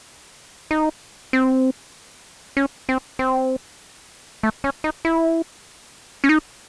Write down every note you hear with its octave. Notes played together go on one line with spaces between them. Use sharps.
D#4
C4
C#4
C4
C4
A3
C#4
D#4
E4
C#4
D#4